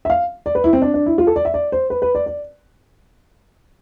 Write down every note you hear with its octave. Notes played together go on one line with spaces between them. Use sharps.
E5
F5
D5
B4
E4
C4
D4
D4
E4
F4
A4
D5
E5
D5
C5
B4
B4
D5
D5